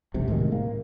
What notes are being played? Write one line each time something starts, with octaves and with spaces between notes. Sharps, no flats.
E1 B1 C3
A2 C3 D#3 G#3
A#3